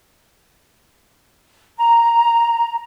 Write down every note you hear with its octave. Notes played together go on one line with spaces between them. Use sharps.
A#5